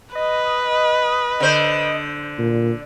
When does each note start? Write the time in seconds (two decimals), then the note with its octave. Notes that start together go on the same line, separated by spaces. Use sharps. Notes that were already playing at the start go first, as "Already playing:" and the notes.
0.15 B4 D#5
1.40 D3 C5
2.38 A#2